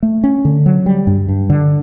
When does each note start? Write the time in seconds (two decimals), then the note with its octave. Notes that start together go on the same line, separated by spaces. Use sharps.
0.03 A3
0.24 C#4
0.45 D3
0.66 F#3
0.86 G3
1.07 G2
1.29 G2
1.50 D3